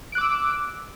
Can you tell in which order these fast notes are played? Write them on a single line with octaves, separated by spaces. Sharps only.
D7 F#6 D6 E6